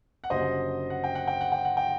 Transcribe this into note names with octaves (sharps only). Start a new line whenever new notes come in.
F#5
F#1 F#2 D3 G3 C5 D#5
F#5
G5
F#5
G5
F#5
G5
F#5
G5